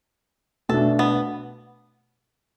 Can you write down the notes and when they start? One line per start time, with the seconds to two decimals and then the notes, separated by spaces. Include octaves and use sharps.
0.69 B2 A3 D4 A4
0.99 B3